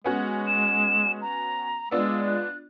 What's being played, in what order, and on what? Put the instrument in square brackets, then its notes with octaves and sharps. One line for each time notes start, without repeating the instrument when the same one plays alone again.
[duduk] G#3 [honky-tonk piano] B3 C#4 F#4
[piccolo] E7
A#5
[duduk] G#3 [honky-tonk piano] B3 D4 F4 [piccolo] E6
[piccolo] F#6